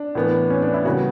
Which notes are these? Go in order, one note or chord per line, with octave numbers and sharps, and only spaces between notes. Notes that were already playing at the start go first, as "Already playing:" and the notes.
Already playing: D4
A2 E3 B3
C#4
D4
E4
C#3 G3 B3 F#4